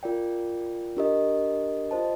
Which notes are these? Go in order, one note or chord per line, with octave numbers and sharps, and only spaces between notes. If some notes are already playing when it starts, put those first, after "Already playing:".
F4 A#4 D5 G5
D4 G4 A#4 D#5
F4 C5 D#5 A5